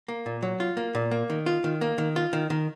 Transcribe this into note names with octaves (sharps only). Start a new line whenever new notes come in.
A#3
A#2
F#3
F4
A#3
A#2
A#3
D#3
F4
D#3
A#3
D#3
F4
D#3
D#3